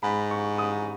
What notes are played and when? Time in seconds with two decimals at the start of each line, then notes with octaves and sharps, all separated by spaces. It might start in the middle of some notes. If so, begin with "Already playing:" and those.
0.03 G#2 B5
0.31 C#6
0.58 D#6